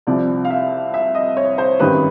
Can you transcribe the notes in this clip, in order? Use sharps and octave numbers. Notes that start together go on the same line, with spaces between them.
C2 C3 F3 D5
F5
E5
E5
D#5
C#5
C5
G#1 F#2 D#3 G3 B4